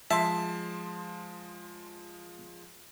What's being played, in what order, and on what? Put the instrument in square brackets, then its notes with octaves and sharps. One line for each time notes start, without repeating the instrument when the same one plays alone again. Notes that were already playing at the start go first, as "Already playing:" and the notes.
[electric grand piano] F3 G#3 C6 [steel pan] E5 [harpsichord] A5